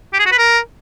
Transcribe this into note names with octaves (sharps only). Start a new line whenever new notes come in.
G4
G#4
F#4
B4
A#4